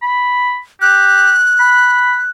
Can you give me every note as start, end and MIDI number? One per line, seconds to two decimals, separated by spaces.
0.02 0.58 83
0.82 1.36 67
0.82 2.30 90
1.60 2.17 83